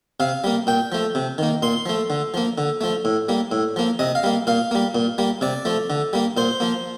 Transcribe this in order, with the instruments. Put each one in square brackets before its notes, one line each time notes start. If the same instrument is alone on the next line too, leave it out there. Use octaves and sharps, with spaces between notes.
[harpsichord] C3 F5
G3 A#3
A#2 G5
F3 A3
C3
D#3 A#3
A#2 C6
F3 A3
D3
F3 A#3
D3
F3 A3
A2
G3 A#3
A2
F3 A#3
C3 D#5
F5
G3 A#3
A#2 F5
G3 A#3
A#2
G3 A#3
C3 D5
F3 A3
D3
G3 A#3
A#2 C5
F3 A#3